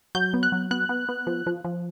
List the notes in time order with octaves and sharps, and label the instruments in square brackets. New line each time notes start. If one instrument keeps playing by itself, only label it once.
[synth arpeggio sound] F#3 G6
B3
F#6
F#3
B3 F#6
B3
B3
F3
F3
F3